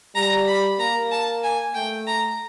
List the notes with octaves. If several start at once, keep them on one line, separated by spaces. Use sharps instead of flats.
G3 A#5
B5
A#3 A#5
A5
G#5
A3 G5
A#5